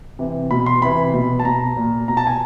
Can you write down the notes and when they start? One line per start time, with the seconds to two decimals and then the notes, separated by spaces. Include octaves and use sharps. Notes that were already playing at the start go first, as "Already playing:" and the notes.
0.19 C3 E3
0.51 B2 B5
0.66 C6
0.82 C3 E3 B5
1.14 B2
1.40 A5
1.45 B2 A#5
1.77 A#2
2.08 B2 A#5
2.17 A5
2.27 G#5